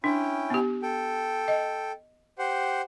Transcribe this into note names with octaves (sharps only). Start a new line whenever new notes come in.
C#4 D4 E4 G5
B3 G4
A4 G5
D#5
G4 C5 F#5